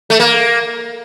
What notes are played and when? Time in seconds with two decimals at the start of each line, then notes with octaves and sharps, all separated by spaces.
0.10 A3
0.20 A#3